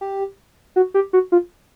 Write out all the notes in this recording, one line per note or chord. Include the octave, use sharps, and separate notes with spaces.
G4
F#4
G4
F#4
F4